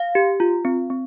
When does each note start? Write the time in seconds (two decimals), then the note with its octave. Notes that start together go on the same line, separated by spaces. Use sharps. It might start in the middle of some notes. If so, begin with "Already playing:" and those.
Already playing: F5
0.15 G4
0.40 F4
0.65 C4
0.90 C4